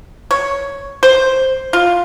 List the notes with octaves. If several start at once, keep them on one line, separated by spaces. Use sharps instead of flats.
C#5
C5
F4